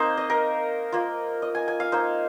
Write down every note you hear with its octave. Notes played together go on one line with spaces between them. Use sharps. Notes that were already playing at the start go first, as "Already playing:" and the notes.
Already playing: A#3 C4 D#4 C5
D#5
A#4
A#3 F4
D#5
G#5
G#5
F5
A#3 D#4 C5